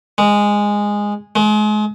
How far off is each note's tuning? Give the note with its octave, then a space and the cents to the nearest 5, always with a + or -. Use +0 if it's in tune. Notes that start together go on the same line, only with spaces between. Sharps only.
G#3 -10
G#3 +35